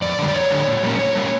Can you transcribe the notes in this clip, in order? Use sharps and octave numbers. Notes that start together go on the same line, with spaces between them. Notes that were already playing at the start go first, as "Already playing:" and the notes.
F2 D5
D3 G3
D5
F2 C#5
D3 G3
A#2
G3 A#3 C#4
A#2 C#5
G3 A#3 C#4